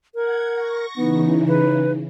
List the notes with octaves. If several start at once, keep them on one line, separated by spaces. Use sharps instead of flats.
A#4 F#5 G#6
C#6 A#6
C#3 E3 B3 D#4
B4